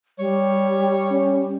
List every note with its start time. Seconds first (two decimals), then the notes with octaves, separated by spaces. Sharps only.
0.19 G3 C#5
1.11 C#4